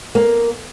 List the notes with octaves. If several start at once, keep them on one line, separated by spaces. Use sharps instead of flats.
A#3